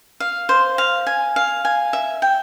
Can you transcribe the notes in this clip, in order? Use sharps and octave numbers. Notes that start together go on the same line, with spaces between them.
F5
C5
F5
G#5
F5
G#5
E5
G5